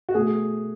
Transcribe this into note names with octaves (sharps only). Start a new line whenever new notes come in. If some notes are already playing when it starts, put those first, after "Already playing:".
F#4
B2 A3 G#4